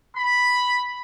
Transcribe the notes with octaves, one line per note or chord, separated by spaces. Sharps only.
B5